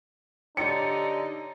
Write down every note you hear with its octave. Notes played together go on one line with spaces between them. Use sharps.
D3 D#4 G4 C#5 C#7